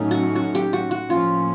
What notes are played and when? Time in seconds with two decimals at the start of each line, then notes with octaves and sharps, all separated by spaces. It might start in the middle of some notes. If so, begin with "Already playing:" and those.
Already playing: A2 F#3 A3 C#4 D#4
0.11 F#4
0.36 F#4
0.55 G4
0.73 F#4
0.91 F#4
1.10 A2 F3 A#3 C#4 F4